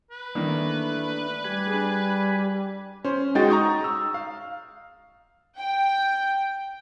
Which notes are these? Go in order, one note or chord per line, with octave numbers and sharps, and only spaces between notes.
B4
D#3 E3 A3 A#3 D4
G3 G4 G#5 B5
D4 G#4
C#4 C5
G#3 D#4 F#4 G5 A6
A#5 C#6 D#6 G6
E6
F5
G5